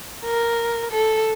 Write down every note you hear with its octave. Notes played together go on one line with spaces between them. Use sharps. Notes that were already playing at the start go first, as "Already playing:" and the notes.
A#4
A4